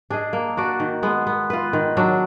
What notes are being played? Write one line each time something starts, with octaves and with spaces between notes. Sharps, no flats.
D4 G#4 D#5
A#3
D4 F#4 D5
D#3
G#3 B3
B3
F4 B4
D#3
F#3 D4